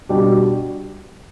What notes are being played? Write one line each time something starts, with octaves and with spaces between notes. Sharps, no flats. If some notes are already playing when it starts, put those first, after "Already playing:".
B2 G3 D4 G4